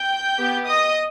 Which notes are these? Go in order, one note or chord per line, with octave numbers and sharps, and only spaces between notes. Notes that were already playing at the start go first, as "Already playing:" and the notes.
Already playing: G5 G6
B3 G4
D#5 D#6